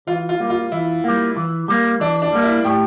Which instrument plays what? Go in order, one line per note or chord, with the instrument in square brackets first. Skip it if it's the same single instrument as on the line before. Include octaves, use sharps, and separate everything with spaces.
[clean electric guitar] E3 [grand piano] F4
[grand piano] F4
[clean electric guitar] G3 A#3
[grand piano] F4
[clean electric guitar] E3 [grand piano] E4
[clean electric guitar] G3 A#3
E3
G3 A#3
[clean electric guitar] E3 [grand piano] D4
[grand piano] D4
[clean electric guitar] G3 A#3
[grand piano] E4
[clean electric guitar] A2 [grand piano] G4